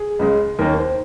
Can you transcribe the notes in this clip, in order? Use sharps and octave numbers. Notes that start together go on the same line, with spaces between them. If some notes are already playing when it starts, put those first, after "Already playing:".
Already playing: G#4
C#2 C#3 G#3
D#2 D#3 A#3 C#4 A#4
C5